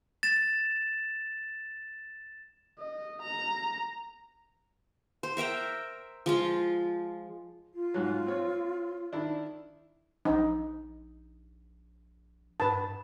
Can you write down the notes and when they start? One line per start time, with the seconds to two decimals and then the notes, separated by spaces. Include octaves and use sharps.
0.23 A6 E7
2.79 D#5
3.22 A#5
5.23 C5
5.37 A#4 E5 G5 A#5
6.26 F3 G#3 F4
7.73 F4
7.94 G#2 F#3
8.27 C4 C#5
9.12 D#3 D4 E4
10.25 A#1 D#4
12.60 G2 B4 A5